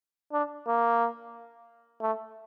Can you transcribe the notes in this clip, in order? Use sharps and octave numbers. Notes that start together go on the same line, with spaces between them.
D4
A#3
A3